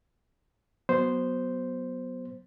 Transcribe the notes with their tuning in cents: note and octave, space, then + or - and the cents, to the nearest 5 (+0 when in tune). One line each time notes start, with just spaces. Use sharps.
F#3 +0 B3 +0 C5 -5